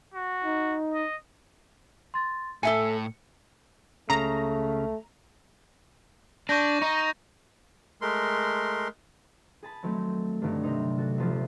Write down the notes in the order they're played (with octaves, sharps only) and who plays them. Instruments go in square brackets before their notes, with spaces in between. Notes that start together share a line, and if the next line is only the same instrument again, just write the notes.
[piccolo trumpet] F#4
[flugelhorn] D#4
[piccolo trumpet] D#5
[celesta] C6 A6
[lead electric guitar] A2 [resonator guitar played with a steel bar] A4 E5 G#5 [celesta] C#7
[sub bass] C#2 [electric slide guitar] C#3 [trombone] A3 [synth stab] A#5
[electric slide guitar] D4 [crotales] C#6 G6 A#6
[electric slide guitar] D#4 [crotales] C#6
[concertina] G#3 A3 A#4 C6
[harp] G#4 A5 B5
D#3 F#3 A3 C4
G2 D3 D#3 F#3 G3
C3 C4 D#4
F#4 A4
D#1 F3 F4